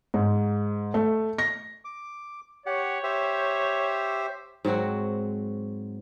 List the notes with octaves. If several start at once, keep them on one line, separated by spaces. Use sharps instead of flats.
G#2
A3
A#6
D6
G4 C#5 F#5
G4 C5 E5
G#2 F#3 C4 F#4